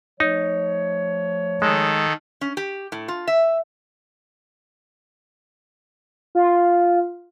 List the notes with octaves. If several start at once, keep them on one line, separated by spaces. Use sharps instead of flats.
F3 A3 D#4 C#5
D#3 G#3 A4
C#4
G4
A2
F4
E5
F4